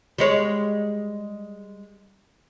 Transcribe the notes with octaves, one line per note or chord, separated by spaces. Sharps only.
G3 G#3 C#5